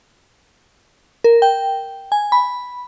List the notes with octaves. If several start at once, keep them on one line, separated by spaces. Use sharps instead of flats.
A#4
G5
G#5
B5